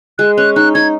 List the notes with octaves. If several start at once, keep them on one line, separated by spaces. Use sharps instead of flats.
G#3 F#6
C#4 F#6
D#4 F#6
D#4 G#6